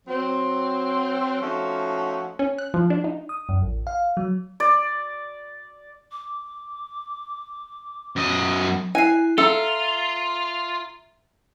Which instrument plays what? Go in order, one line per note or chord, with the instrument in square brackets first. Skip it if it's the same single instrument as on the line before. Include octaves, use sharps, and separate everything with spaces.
[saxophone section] F#3 C4
F3 A3 C#4 D#4 F#4
[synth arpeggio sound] C#4
F#6
F3
D4
D#4
[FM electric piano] D#6
F#2
A1
F5
F#3
[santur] D5
[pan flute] D6
[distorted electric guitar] F#2 D#5
[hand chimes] E4 C7 [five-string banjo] G#5
[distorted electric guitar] F4 [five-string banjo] A4 [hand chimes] E5 A#5